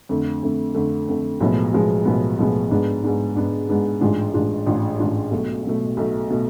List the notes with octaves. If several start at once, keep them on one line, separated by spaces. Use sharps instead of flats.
F2 D3 A3
F2 D3 A3
F2 D3 A3
F2 D3 A3
B1 A2 F3 G#3 B3
B1 A2 F3 G#3 B3
B1 A2 F3 G#3 B3
B1 A2 F3 G#3 B3
G#2 G#3 B3 D4
G#2 G#3 B3 D4
G#2 G#3 B3 D4
G#2 G#3 B3 D4
A1 G#2 G#3 D4 F4
A1 G#2 G#3 D4 F4
A1 G#2 G#3 D4 F4
A1 G#2 G#3 D4 F4
B1 B2 A3
B1 B2 A3
B1 B2 A3
B2 A3